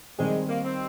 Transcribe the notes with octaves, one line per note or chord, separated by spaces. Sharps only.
D#3 G3 G#3 C4 G4
A#3
C4